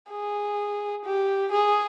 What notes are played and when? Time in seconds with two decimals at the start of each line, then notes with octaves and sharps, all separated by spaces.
0.10 G#4
1.05 G4
1.52 G#4